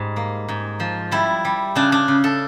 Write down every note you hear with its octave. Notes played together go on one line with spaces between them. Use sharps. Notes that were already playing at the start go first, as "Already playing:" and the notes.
Already playing: G#2 G3
A#3
G#2
F3
G3 E4
G3
C#3 D4
D4
C#3
A4